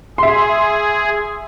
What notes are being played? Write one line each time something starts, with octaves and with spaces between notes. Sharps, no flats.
G#4 E5 C6